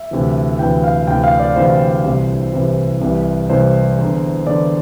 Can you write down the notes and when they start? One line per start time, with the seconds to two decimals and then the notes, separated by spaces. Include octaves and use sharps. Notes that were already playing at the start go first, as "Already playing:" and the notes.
Already playing: E5
0.11 D2 C3 E3
0.59 D2 C3 E3 G5
0.84 F5
1.07 D2 C3 E3 G5
1.24 F5
1.40 D5
1.56 D2 C3 E3 C5
2.04 C2 C3 E3
2.53 C2 C3 E3
3.01 C2 C3 E3
3.50 C2 C3 E3 C5
3.99 E2 D3
4.46 E2 D3 D5